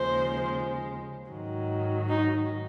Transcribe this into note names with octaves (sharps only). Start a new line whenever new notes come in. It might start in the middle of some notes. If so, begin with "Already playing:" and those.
Already playing: D#2 C#3 F3 G#3 C5
G#2 D#3 F#3
D#4